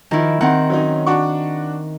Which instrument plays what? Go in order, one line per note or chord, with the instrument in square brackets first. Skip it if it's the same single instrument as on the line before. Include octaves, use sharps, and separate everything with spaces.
[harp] D#3 E4 [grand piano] F3
[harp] D#3 C4 [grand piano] F#5
[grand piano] F#3 C#4 D#4
D4 F#4 C#6